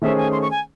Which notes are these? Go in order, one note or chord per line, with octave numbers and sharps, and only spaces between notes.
D#3 A3 C#4 G#4 C5 E5
G#5
C6
C#6
G#5